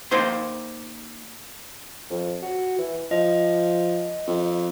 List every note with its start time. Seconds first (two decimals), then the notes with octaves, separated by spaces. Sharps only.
0.11 A#3 D#4 C5 C6
2.10 F2
2.42 F#4
2.78 E3
3.11 F3 D#5
4.27 F2